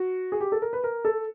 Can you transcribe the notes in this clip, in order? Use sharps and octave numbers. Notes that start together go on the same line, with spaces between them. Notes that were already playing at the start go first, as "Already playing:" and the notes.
Already playing: F#4
G#4
G4
A4
A#4
B4
A#4
A4